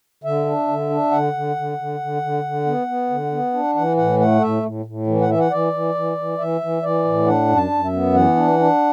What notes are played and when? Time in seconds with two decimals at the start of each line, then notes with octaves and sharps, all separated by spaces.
0.24 D3 E5
0.46 D4
0.68 D3
0.90 D4
1.11 D3 F#5
1.33 D3
1.56 D3
1.78 D3
2.00 D3
2.22 D3
2.44 D3
2.66 B3
2.87 B3
3.10 D3
3.32 B3
3.54 D4
3.75 E3 F#5
3.97 A2 F#5
4.19 A3 F#5
4.41 A2 E5
4.63 A2
4.86 A2
5.07 E3
5.21 F#5
5.29 E3 E5
5.39 F#5
5.50 E3 D5
5.73 E3
5.95 E3
6.17 E3
6.38 E3 E5
6.61 E3
6.82 E3 D5
7.05 A2
7.27 D4 F#5
7.48 F#2
7.56 A5
7.71 F#2
7.85 E5
7.93 B3
8.14 E3 F#5
8.36 D4
8.59 D4